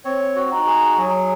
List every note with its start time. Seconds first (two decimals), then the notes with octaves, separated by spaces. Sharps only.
0.05 C4 C#5
0.36 F#4
0.52 D#4 F#4
0.67 G#4
0.98 F#3 G#4